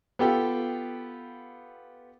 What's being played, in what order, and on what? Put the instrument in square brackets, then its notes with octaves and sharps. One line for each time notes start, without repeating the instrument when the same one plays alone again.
[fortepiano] B3 F4 G4 A4 F5 G5